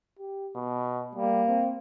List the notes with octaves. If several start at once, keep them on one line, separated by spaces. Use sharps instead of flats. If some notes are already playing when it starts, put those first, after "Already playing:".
G4
B2
G3 A#3
C4